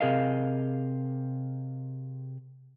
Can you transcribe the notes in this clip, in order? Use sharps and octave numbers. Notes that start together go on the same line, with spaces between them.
C3 G#4 A#4 D#5 F5